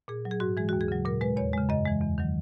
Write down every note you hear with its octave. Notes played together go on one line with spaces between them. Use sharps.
A#2 G#4
F#3
G#4
G#2 F#4
E3 G#3 G#4
D#2 F#4
G#4
C#3 F#3
A#2 A#4
G#3 B4
E2 C#5
C#3 G#3
F#2 D#5
E3 G#3
E2
D#3 F#3